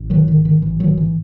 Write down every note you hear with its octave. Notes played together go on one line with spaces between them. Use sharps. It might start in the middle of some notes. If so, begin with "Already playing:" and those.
Already playing: A1
G#2 D#3 F#3
D#3
G#2
D#3
A1 E3
D#3 F#3
G#2
E3